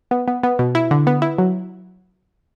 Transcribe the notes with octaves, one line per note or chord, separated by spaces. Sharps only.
B3
B3
B3
B2
E4
D3
B3
E4
F#3